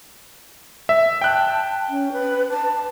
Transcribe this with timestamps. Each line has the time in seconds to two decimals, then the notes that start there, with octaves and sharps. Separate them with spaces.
0.89 E5
1.21 G5 A5 F#6
1.89 C#4
2.13 B4
2.50 A5